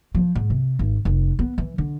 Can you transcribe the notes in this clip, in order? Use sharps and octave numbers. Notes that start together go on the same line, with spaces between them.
F3
G#2
C3
G#1
F1
B3
E3
D3